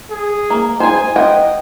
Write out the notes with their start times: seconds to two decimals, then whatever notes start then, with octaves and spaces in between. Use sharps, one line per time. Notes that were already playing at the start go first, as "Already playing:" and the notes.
0.10 G#4
0.50 A#3
0.80 G#4 C5 G#5
1.16 D#5 F#5 G5